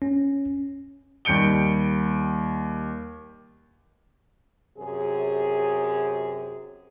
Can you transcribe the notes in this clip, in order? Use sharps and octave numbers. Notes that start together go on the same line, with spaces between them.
C#4
D#2 G3 G6 C#7 D7 G7
F#2 C3 G#4